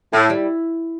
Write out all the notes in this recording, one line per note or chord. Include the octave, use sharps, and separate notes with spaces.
A2 E4
G3